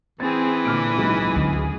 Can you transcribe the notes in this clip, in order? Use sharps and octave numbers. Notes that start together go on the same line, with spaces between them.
E3 C4 G#4 A6
A#2 D3 D6 F6 D7
C#2 G#2 F#3 G#4
D2